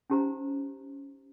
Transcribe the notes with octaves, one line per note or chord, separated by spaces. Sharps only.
C#4 D#4 G4 C5 A#5